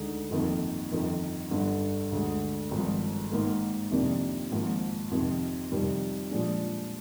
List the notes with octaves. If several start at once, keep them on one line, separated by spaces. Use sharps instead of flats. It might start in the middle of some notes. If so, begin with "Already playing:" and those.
Already playing: D2 D3 G#3 D#4
G1 F2 D#3 A#3
G1 F2 D#3
G1 G2 D3
D2 D3 G#3
G#1 G2 F3 G#3
G#2 D#3 A#3
F2 C3 D#3 A#3 D4
G#1 G#2 F3 A#3
F2 C3 D#3
F2 C3 D#3 G3
A#2 F3 G#3 D4